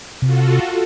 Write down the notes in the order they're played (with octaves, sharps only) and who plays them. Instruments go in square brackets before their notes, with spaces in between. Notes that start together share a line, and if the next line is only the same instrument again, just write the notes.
[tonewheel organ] C3 [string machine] F4 F#4 A4